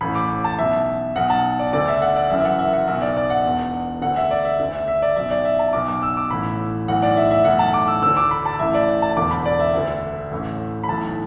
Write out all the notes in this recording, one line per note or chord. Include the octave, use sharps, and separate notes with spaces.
A1 A2 E3 B5
D6
D6
A5
B1 B2 E5
B1 B2 F#5
A5
D5
D2 D3 D5
E5
F#5
D5
F#1 F#2 E3 E5
E5
F#5
E5
F#5
B1 B2 E5
D5
D5
F#5
E1 E2 B2
D2 D3 F#5
E5
D5
E5
D2 D3
E5
E5
D5
B1 B2 E5
D5
E5
A5
B1 B2 D6
D6
E6
D6
A1 A2 E3 B5
B1 A2 E3 F#5
D5
E5
E5
B1 A2 E3 F#5
A5
D6
E6
D2 D3 E6
D6
B5
A5
A1 A2 E3 E5
D5
A5
E1 E2 D3 D6
B5
D5
E5
D2 D3
A1 A2 E3
B5
B1 A2 E3 A5